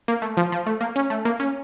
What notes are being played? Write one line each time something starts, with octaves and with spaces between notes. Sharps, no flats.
A#3
A3
F3
F3
A3
A#3
C#4
A3
A#3
C#4